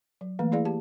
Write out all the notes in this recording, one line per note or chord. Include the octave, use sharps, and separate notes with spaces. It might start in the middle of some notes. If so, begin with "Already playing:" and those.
F#3
E3 A3 A#3
E4 G#4 D5 F5
G4 A5